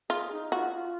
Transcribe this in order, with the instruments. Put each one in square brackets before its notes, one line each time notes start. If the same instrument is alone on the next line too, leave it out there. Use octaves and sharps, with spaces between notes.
[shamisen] F4 [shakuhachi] G#4
[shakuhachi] D#4
[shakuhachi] F4 [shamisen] F#4
[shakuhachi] F4